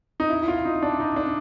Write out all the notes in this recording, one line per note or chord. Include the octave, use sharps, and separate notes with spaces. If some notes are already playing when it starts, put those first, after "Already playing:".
D#4
E4
E4
F4
D#4
D4
D#4
D4